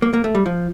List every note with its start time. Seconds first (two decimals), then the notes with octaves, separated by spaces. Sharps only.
0.02 A#3
0.13 A#3
0.24 A3
0.35 G3
0.46 F3